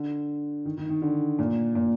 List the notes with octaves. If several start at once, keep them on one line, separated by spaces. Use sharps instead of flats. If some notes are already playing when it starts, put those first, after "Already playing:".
Already playing: D3
D#3
D#3
D#3
D3
A#2
A#2